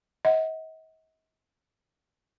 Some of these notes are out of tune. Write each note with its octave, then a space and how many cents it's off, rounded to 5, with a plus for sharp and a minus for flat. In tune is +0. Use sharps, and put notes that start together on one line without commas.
D#5 +40 F#5 +0